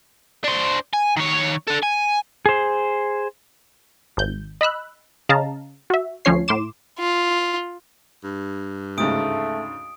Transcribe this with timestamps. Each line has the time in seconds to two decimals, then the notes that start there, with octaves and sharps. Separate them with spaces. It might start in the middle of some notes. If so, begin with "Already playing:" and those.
0.44 D4 C5
0.93 G#5
1.17 D#3 C#5
1.68 D4 A4
1.83 G#5
2.46 G#4 C5
4.17 G#1 G6
4.61 D#5 B5 E6 F#6
5.29 C#3 D#5 F5 A5 A#5
5.90 F#4 E5
6.25 D2 F3 C#4 C#5 C7
6.48 A2 C6 D6 E7
6.99 F4
8.24 G2
8.98 D2 G#2 C#3 A3 D#6 D7